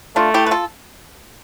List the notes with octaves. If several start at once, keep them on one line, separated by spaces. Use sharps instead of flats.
A3 D4 F4
E4 G4
B4
F4 A4